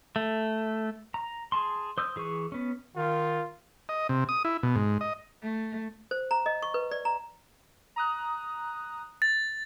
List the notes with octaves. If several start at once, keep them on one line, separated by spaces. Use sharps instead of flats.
A3
A#5
G#4 A5 C6
C5 D#6 E6 G6
E3 G#4 B4 C#6
B3 C#4
D#3 F4
D#5
C3
D#6
E4
B2
G#2
D#5
A3
C5
A#5
D#5
C#6
B4
D5
A#5
A#5 D#6 F#6
A6